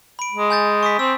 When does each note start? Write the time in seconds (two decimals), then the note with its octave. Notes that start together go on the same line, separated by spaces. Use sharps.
0.19 B5 D7
0.32 G#3
0.50 G#5 G6 A6
0.83 C#6 D#6 B6
0.99 C4 E6